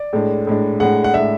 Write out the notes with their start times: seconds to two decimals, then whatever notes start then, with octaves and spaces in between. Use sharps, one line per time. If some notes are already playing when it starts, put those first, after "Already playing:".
Already playing: D5
0.13 A2 G#3 D4
0.47 A2 G#3 D4
0.80 A2 G#3 D4 F#5
1.04 F#5
1.14 A2 G#3 D4 E5